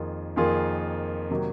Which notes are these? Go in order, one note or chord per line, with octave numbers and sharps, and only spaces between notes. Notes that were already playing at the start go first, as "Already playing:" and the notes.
Already playing: F2 D#3 A#3 F4 G#4
F2 D#3 A#3 F4 G#4
C3 D#3 F#3 A#3 D#4